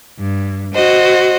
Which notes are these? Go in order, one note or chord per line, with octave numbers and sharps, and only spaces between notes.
G2
F#4 C5 D#5